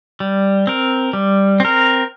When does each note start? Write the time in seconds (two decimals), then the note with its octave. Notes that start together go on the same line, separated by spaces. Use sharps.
0.20 G3
0.67 C4 A#4
1.13 G3
1.60 C4 A#4